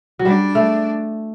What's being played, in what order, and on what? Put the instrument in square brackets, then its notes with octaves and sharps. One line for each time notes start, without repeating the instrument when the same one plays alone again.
[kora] F#3
[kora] G3 [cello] D4
[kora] A3